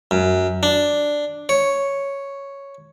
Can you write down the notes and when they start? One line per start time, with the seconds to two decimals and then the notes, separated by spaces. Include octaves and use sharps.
0.11 F#2
0.63 D4
1.49 C#5